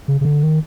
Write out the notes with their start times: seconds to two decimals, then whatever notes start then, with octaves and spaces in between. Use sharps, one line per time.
0.08 C#3
0.21 C#3
0.25 D3
0.43 D#3